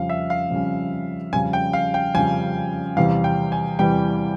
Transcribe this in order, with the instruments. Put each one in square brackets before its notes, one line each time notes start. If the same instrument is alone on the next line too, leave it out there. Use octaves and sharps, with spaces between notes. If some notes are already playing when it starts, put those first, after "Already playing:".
Already playing: [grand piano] F2 C#3 G3 C#4 [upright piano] F5
[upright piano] E5
F5
[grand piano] F2 C#3 G3 C#4
[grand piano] F2 C#3 G3 C#4 [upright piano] G#5
[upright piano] G5
F5
G5
[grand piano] F2 C#3 G3 C#4 [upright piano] G#5
[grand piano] E2 C3 E3 G3 [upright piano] F5
[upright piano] G5
G#5
[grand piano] E2 C3 E3 G3 [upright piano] G5